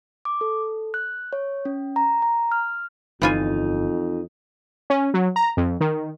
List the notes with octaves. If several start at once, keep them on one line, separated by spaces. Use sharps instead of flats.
D6
A4
F#6
C#5
C#4
A#5
A#5
F6
G1 F2 E3 D#4 F4 G#5
C#4
F#3
A#5
F2
D#3